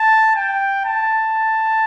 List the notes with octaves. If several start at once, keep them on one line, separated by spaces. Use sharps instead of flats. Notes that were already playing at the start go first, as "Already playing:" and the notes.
Already playing: A5
G5
A5